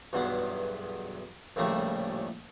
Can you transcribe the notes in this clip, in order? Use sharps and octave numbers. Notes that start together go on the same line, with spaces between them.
B1 E2 G2 B3 F5 F#5
A#1 D#2 A2 C#3 G3 A3